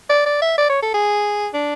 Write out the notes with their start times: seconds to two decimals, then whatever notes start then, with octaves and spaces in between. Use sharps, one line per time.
0.10 D5
0.26 D5
0.42 E5
0.58 D5
0.70 C#5
0.82 A4
0.94 G#4
1.54 D4